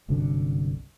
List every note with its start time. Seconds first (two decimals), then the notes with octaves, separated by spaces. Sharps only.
0.08 G1 C2 F#2 D3